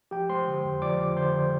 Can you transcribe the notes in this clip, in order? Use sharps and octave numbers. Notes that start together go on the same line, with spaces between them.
F3 G4 G5
G#3 C5 C6
D3
F2
F3 D5 D6
G#3
D3 C5 C6